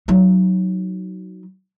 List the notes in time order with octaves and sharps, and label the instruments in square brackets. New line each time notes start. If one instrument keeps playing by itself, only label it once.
[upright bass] F#3 D#4